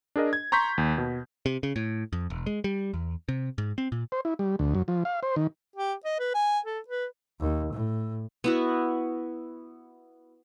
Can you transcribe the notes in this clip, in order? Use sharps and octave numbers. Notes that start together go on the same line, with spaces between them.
D4 G#4 A#4 D#5
G#6
A#5 C6 C#6 G6 B6
D#2
B2
C3
C#3
A2
F2
E1
G#3
G3
E2
C3
G#2
C4
A#2
C5
E4
G3
D2
F#2
F3
F5
C5
D#3
G4
D#5
B4
G#5
A4
B4
D#2
A2
B3 E4 F#4